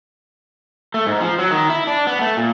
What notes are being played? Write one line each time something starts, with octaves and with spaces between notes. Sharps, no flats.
A3
G#2
F3
F#3
D#3
E4
D4
B3
A3
A#2